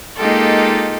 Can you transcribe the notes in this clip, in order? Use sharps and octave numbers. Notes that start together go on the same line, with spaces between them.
G#3 A#3 D#4 F4 G4 A4